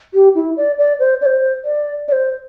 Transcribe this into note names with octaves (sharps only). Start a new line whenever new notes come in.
G4
E4
D5
D5
C5
D5
C5
D5
D5
C5